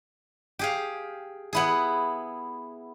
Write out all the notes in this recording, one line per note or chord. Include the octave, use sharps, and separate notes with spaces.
G4 G#4 F5
B3 E4 G#4